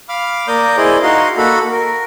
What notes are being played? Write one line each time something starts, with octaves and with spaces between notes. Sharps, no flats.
F5 B5 D6 F6
A#3 A#4 D5 D6 D#6 G6
E4 G#4 C5 D5 D#5
D#4 F#4 D#5 F5 C6
A#3 F#4 A4 B5
A#4